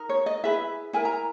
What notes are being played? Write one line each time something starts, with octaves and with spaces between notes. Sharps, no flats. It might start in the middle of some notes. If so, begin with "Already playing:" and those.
Already playing: D#4 A#4
C#5
D#5
E4 G#4 B4 E5
E4 A#4 G#5
A#5